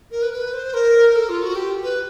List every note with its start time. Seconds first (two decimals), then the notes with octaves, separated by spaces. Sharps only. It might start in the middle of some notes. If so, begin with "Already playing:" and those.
0.11 A#4
0.22 B4
0.33 B4
0.54 C5
0.74 A#4
1.16 A4
1.29 F4
1.42 F#4
1.56 G4
1.83 B4